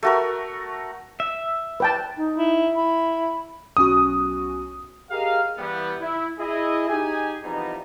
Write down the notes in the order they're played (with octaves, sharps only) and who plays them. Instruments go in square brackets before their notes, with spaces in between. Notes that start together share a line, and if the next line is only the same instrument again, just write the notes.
[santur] A3 F#4 A#4
[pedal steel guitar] E5
[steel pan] B4 G5 A5
[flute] D#4
[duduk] E4
[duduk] E4 [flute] B5
[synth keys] B1 C#4 F#4 [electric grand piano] D#6
[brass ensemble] G4 G#4 A#4 D#5 F5
E3 G3 B3
E4
E4 G#4 D#5
D#4 G4 G#4 G#5
F2 E3 G3 B3 D#4